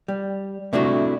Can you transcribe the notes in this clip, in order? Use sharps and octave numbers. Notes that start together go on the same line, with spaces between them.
G3
C3 A3 D4 E4 F#4